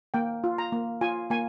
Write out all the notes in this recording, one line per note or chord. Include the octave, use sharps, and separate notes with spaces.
A#3 G5
F4
A#5
A#3
F4 G#5
A#3 G#5